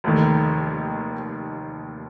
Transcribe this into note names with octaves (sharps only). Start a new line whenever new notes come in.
F1 D#2 D#3